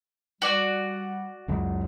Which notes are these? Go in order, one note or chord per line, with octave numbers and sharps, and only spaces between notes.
G3 F#4 D5
C#2 F#2 C#3